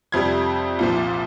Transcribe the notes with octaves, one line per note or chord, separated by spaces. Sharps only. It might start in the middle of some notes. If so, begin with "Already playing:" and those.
F2 C3 G3 G#6
C2 A#2 F3